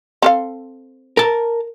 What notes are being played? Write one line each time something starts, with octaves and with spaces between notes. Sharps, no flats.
C4 A4 F5
A#4 A5